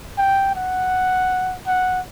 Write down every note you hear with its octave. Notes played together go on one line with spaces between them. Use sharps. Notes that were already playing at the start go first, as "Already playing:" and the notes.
G5
F#5
F#5